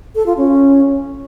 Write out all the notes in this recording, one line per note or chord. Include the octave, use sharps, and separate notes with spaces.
A4
F4
C#4